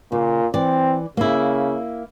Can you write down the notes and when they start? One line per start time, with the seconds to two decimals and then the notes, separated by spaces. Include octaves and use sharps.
0.12 A#2 C#3
0.54 E3 C4 D5
1.17 C#3 A#3 E4